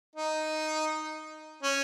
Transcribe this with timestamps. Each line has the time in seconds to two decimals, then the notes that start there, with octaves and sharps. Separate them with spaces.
0.16 D#4
1.63 C#4